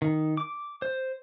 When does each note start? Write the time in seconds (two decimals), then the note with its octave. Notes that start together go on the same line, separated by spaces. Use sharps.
0.02 D#3
0.37 D6
0.82 C5